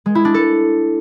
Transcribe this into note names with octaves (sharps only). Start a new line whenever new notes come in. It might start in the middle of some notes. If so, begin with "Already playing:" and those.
G#3
E4
D4
A4